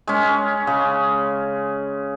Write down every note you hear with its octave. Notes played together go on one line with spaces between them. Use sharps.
G#3 C#4
C#3 G#4